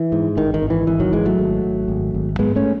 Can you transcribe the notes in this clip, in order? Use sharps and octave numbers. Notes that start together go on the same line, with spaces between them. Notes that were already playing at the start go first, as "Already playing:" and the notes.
Already playing: E3
G#2
G#1 D#3
D#3
G#1
E3
G#1 E3
D#3 F#3
G#1 E3 G#3
F#3 A3
G#1
G#1
G#1
G#1
G#2 G#3 B3
A3 C#4